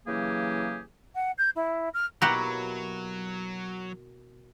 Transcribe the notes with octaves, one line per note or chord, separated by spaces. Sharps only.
C#3 E3 F#3 A#3 G4 G#4
F#5
G6
E4
F6
B2 F#3 A#3 E4 F#4 G4 F#5 A#5